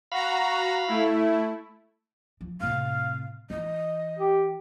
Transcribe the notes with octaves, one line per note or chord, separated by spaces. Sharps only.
F#4 F5 A#5 B5
A3 E4
F3
A2 C3 F5
E3 D#5
G4